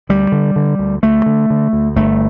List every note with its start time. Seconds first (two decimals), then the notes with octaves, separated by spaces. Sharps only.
0.09 D2 G3
0.32 D3
0.56 D3
0.79 D2
1.03 D2 A3
1.26 D3
1.50 D3
1.73 D2
1.96 G1 A3